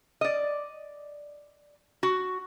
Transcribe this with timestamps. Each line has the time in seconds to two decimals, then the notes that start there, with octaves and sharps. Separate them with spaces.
0.21 D5 D#5
2.03 F#4